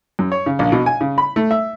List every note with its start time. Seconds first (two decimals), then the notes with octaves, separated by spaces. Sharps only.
0.19 F#2
0.32 C#5
0.46 C#3
0.59 A#1
0.72 B2
0.86 G#5
1.01 C#3
1.18 B5
1.36 A3
1.51 E5